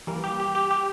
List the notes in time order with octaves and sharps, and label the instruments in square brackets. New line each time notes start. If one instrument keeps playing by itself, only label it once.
[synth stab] E3 G3 A#3
G4
G4
G4
G4